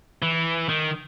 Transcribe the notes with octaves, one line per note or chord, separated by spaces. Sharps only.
E3
D#3